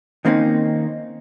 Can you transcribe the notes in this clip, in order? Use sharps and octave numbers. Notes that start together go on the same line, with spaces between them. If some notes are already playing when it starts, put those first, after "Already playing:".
D#3 A#3 C4 C#4 D#4